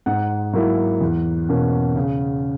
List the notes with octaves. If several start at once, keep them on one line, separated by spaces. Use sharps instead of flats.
G#2 F#5
F#3 A#3 E4
E2
B2 A#3 C#4
C#3